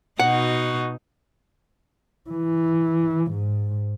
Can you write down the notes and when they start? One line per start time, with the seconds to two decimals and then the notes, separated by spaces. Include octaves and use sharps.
0.20 B2 D#4 F#4 F#5
2.30 E3
3.31 G#2